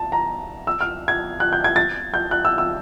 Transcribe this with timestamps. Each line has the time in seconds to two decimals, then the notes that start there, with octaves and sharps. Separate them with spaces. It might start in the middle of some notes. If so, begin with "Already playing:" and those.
Already playing: A5
0.12 A#5
0.67 E6
0.81 F6
1.08 G#6
1.40 F#6
1.53 G6
1.64 G#6
1.76 A6
2.14 G6
2.31 F#6
2.45 E6
2.58 E6